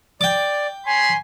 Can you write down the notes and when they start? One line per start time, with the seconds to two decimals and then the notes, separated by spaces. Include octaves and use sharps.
0.21 D5 G5 D6
0.87 C#5 G#5 B5 C6